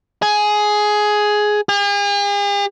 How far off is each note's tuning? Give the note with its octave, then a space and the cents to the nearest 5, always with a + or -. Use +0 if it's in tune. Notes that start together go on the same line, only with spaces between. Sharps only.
G#4 +10
G#4 -45